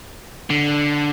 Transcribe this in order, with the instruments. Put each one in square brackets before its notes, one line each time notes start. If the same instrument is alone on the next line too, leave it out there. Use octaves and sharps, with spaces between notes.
[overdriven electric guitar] D3